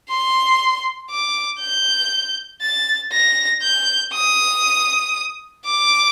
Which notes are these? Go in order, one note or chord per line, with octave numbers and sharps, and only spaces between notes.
C6
D6
G6
A6
A#6
G6
D#6
D6